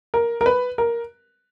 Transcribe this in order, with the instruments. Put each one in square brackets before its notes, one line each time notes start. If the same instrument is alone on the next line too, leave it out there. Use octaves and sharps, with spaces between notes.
[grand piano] A#4
A#4
B4
A#4